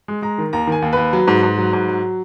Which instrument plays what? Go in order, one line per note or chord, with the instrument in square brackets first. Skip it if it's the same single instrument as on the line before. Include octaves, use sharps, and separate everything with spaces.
[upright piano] G#3
G#3 A#5
D#3
D#2 A#5
D#3 G#5
D#2
D#2 B4
F#3
G#2
G#2
F#3
G#2
F#3